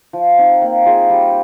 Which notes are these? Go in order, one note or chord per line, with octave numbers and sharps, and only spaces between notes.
F3
C4 D#4
A#3
F4 G#4 C5
G3